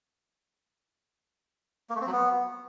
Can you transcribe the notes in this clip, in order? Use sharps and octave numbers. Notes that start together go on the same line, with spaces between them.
A#3
A3
C4
F#3
B3